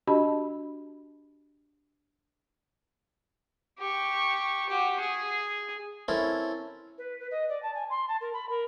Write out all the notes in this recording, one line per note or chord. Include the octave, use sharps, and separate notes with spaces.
D4 F#4 G4 D#5 A5 B5
G4 C#6
F#4 G4
G#4
C4 C#4 E4 A4 A#4
B4
B4
D#5
D5
A5
G#5
C6
A5
A#4
B5
A#4